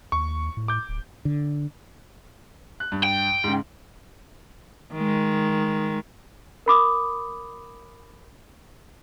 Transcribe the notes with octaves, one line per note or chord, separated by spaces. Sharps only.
D#2 C#6
A2
D6 G6
D1
D3
F#6
G2
G5
G#2 C#3
D#3 G#3
A#4 B5 D6 D#6